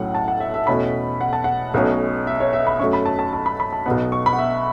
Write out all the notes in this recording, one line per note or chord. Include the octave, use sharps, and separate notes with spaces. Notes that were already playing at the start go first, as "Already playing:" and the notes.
Already playing: B1 A2 F#3 C#4 F#5
A5
F#5
E5
E5
E2 B2 A3 C#4 B5
F#5
A5
F#5
B1 B2 A3 C#4
E5
C#5
E5
B5
F#2 F#3 A3 C#4 C#6
B5
A5
A5
A5
B5
B5
A5
B1 B2 B3 F#5
C#6
B5
F#5
E5